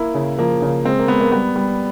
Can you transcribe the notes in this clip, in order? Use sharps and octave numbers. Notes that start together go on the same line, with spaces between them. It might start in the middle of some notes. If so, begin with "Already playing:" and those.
Already playing: A#3 E4
C#3
F3 A#3
C#3
G#3 C4
A#3
G#3 B3
A#3
G3 B3
G3